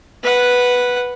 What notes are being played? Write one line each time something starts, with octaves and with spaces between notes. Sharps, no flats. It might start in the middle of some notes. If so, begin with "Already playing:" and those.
B4 F#5